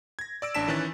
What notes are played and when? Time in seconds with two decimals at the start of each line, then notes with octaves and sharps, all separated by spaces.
0.19 G#6 A#6
0.42 D5 E6 D7
0.55 A1 D4 A5 B6 E7
0.68 D#3 E3 C#4 F#6 A6